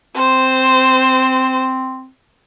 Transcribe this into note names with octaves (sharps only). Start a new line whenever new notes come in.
C4 C5